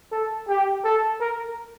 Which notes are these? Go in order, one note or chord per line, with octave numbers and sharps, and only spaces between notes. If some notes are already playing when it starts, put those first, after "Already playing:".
A4
G4
A4
A#4